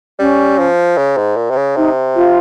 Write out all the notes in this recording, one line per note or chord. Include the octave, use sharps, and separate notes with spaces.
G3 C#4
F3
C#3
G#2
A#2
C3
C#3
C3 D#4
F4